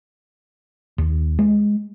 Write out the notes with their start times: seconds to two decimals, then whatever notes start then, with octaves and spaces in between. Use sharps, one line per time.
0.98 D#2
1.39 G#3